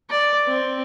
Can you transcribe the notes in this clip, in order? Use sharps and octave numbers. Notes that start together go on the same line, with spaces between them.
D5
C4